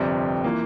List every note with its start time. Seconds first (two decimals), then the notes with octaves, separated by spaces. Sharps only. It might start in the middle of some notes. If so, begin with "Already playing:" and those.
Already playing: G1 F2 C3 G3 C4
0.44 E3 A#3 F4